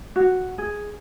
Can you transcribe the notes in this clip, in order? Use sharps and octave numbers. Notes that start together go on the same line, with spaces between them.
F#4
G#4